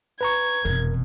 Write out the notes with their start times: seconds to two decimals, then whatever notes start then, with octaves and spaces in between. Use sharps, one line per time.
0.21 B4 A#5 C#6 G#6
0.65 F1 E2 B2 A#4